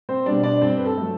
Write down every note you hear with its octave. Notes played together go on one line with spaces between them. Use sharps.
C4 C5
B2 G3 D4 D5
D4 D5
G2 C4 C5
B4
A4
F#3 A3